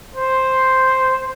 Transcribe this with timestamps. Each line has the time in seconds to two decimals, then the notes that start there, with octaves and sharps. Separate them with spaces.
0.16 C5